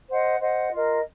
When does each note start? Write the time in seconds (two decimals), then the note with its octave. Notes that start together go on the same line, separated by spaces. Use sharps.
0.10 C5 D#5 F#5
0.41 C5 D#5 F#5
0.71 F4 A#4 D#5